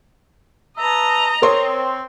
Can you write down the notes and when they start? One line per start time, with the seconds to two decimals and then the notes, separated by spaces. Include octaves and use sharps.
0.78 B4 D#5 E5 A5 A#5
1.42 C4 A#4 C#5 C6